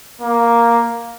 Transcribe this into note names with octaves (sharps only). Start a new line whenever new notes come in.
A#3